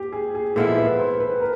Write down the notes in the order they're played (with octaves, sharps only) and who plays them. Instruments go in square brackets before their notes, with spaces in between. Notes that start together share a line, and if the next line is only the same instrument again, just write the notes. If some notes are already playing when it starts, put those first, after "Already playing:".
Already playing: [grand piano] G4
G#4
G#4
[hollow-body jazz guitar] A#2 F3 G#3 B3 E4 [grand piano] A4
[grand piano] B4
C5
B4
A#4